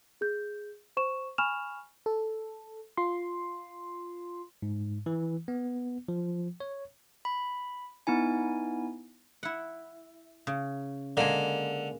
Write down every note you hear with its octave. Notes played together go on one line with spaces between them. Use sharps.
G#4 G6
C5 C#6 E7
G#5 B5 C#6 F6 E7 F7
A4
F4 C6
G#2
E3
B3
F3
C#5
B5
B3 D#4 E4 G#5
E4 F#5
C#3
D3 G#3 A#3